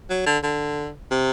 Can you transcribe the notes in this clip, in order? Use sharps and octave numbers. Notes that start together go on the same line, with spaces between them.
F#3
D3
D3
C3